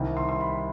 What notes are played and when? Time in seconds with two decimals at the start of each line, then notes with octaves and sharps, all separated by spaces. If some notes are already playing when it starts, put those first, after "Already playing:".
Already playing: C2 C3 D#3 G3
0.17 C6
0.29 C6
0.41 B5